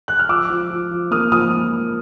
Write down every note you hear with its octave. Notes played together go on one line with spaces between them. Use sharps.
F#6
F6
F3 D6 E6
F3
F3
F3
A#3 D#6 F6
F3 D#6 F6